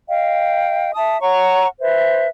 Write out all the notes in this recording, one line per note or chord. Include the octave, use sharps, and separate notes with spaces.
D#5 F5 G5
E5 A5 D#6
C#5 F#5 A#5 C#6
B4 C5 E5